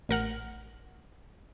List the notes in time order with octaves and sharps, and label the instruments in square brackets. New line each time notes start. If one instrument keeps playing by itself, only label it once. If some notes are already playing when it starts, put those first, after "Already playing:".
[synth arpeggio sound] A1 A#4 F#5 F6